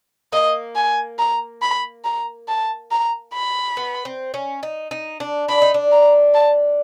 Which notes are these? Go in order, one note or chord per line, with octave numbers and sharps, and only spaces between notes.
A#3 D#5
G#5
A#5
B5
A#5
A5
A#5
B5
B3
C4
C#4
D#4
D#4
D4
D4 B5
D#4
D4
A#5
A5